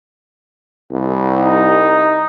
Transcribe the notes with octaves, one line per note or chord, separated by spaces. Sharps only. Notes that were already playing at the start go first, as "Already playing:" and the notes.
C2
D#4